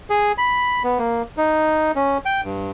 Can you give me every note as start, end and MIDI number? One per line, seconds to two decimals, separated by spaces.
0.10 0.32 68
0.38 0.83 83
0.84 0.98 59
0.99 1.22 58
1.37 1.92 63
1.96 2.18 61
2.25 2.41 79
2.44 2.71 43